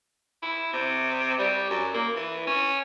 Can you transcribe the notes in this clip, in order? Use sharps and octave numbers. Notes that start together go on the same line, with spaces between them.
E4
C3
G3
F#2
A#3
E3
C#4